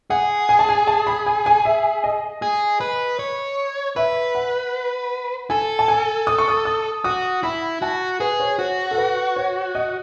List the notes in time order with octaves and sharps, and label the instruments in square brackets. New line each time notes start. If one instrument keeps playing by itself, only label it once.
[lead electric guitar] G#4 [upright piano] F#5
[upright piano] G#5
A5
G#5
A5
B5
G#5
G#5
E5
D#5
[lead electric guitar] G#4
B4
C#5
[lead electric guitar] B4 [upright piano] E5
[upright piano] F#5
[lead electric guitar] A4 [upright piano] G#5
[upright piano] A5
G#5
D#6
C#6
D#6
D#6
[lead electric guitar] F#4 [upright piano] D#6
[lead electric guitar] E4 [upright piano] B5
[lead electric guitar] F#4 [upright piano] A5
[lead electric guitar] G#4 [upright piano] B4
[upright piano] C#5
[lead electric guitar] F#4 [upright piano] C#5
[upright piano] A4
B4
C#5
D#5